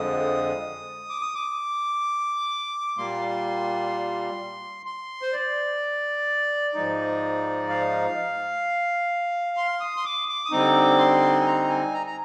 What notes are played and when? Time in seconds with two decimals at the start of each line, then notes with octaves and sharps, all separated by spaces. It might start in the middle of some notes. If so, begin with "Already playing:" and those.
Already playing: F2 D3 F3 G#3 D#6
1.10 D6
1.22 D#6
1.35 D6
2.97 A#2 G3 A#3 C6
4.86 C6
5.22 C5
5.33 D5
6.75 G#2 F3 G#3 D#4
7.69 F5
9.57 C6
9.80 D#6
9.96 C6
10.05 D6
10.29 D6
10.45 D#6
10.51 D3 G3 C4 D#4 D6
10.98 C6
11.40 G#5
11.46 A#5
11.69 G#5
11.94 A#5
12.07 A#5